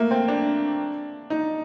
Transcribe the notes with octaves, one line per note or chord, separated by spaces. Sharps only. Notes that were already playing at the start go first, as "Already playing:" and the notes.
Already playing: A3 A#3
C4
D4
D#4